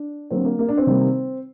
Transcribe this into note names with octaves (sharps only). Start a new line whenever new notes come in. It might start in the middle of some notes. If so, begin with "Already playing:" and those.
Already playing: D4
D3 F#3 A#3 C4
A#3
A#3
D4
C4
C3 D#3 G3 A#3